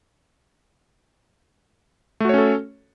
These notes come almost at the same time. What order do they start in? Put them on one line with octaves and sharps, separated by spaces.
A3 F#4 C#5 C#4 A4